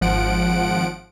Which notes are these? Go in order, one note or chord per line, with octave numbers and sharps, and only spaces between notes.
G#1 F3 F#5 D7